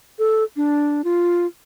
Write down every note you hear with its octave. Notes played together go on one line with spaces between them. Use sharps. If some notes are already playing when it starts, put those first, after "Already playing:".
A4
D4
F4